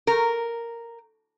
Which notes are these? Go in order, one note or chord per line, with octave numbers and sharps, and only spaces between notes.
A#4